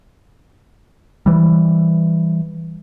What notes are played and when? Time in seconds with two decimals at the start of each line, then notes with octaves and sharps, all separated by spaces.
1.26 E3 G3